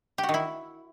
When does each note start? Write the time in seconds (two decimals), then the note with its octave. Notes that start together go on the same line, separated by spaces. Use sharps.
0.18 G4
0.23 F#4
0.29 D#3
0.34 E4